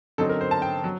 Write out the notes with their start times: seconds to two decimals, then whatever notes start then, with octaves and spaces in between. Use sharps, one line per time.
0.18 D3 F#3 C4 D#4 A4
0.29 A#4
0.41 C5
0.51 A5
0.62 G5
0.84 F#3